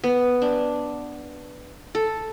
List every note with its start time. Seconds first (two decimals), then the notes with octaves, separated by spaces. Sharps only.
0.04 B3
0.42 D4
1.95 A4